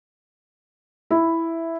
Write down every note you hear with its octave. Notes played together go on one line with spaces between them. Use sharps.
E4